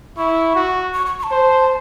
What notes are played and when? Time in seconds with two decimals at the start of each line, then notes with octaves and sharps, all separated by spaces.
0.18 E4 C#6
0.55 F#4
0.94 C#6
1.06 C#6
1.19 C#6
1.23 A5
1.31 C5